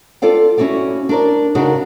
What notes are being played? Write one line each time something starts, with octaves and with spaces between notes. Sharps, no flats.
F4 A4 D5 F5 G5
C#4 E4 F#4 C#5 D5
D4 A#4 D5
C#3 D4 D#4 F#4 G#4 A#4